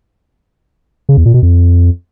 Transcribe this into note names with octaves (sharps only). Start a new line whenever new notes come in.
C#3
E2
A#2
B2
F2